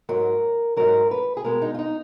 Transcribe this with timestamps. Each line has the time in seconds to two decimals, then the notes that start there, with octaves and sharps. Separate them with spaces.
0.09 G#2 F#3 A#4
0.77 G#2 F#3 A#4
1.11 B4
1.37 G#4
1.44 B2 G#3 A#4
1.62 D#4
1.74 F4
1.79 D#4